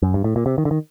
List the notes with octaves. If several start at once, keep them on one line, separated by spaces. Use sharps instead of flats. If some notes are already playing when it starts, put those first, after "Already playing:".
F#2
G2
A2
A#2
C3
D#3
D3
D#3